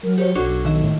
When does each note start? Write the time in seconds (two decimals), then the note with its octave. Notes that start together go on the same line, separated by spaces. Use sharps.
0.03 F#3 A#4
0.18 G4 C5 C#5
0.35 B1 D4 F#4 A4 C#6
0.65 D#3 E5
0.82 A2